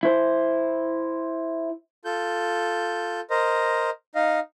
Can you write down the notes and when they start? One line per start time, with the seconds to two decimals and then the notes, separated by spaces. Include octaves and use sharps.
0.03 E4 C5
2.05 F4 A4 G6
3.30 A#4 C5 D#5
4.15 D#4 D#5 F5